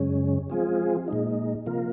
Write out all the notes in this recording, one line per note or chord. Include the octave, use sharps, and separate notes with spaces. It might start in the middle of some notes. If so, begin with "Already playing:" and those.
Already playing: F#2 C#3 G#3 C#4
F3 G#3 C4 F4 G#4
A#2 G#3 D#4
C3 F3 A#3 F4 A#4